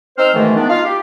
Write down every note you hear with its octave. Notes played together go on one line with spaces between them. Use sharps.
C4 D#4 C5 E6 F6
G#2 B2 D#3 E3 G#3 A3
D#3 B3 D4
D#4 F4 F5
G4